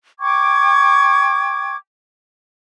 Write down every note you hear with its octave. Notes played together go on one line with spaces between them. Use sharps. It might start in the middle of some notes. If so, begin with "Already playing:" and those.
G5 C#6 D6 G#6